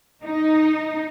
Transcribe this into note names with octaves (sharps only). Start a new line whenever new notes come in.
D#4